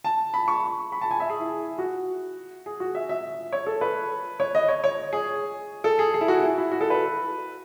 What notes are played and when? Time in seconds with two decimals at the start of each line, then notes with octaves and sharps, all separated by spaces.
0.04 A5
0.34 B5
0.48 C#6
0.92 B5
1.02 A5
1.11 G#5
1.20 E5
1.30 G#4
1.40 E4
1.78 F#4
2.66 G#4
2.80 F#4
2.95 E5
3.09 E5
3.53 C#5
3.66 A4
3.81 B4
4.40 C#5
4.55 D#5
4.68 C#5
4.84 C#5
5.13 G#4
5.84 A4
5.99 G#4
6.14 G#4
6.21 E4
6.28 F#4
6.43 E4
6.58 E4
6.72 F#4
6.81 A4
6.90 B4